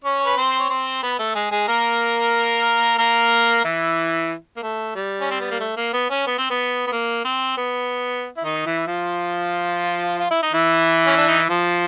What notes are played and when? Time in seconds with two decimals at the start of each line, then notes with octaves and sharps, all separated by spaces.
0.04 C#4 C#5
0.26 B4
0.37 C4 C5
0.59 C#5
0.70 C4 C5
1.03 B3 B4
1.19 A3 A4
1.35 G#3 G#4
1.51 G#3 G#4
1.68 A#3 A#4
2.98 A#3 A#4
3.64 E3 E4
4.57 A#3
4.63 A3
4.95 G3
5.21 C#4
5.31 C4
5.41 B3
5.51 A#3
5.60 A3
5.77 A#3
5.93 B3
6.10 C#4
6.27 B3
6.38 C4
6.50 B3
6.87 B3
6.92 A#3
7.25 C4
7.57 B3
8.37 E4
8.44 D#3 D#4
8.66 E3 E4
8.87 F3 F4
10.19 F4
10.31 E4
10.43 D#4
10.53 E3 E4
11.06 C#4
11.17 D4
11.28 D#4
11.39 E4
11.49 F3 F4